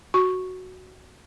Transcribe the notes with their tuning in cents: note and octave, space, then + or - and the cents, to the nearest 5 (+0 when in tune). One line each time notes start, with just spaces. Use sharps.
F#4 +0 C#6 +0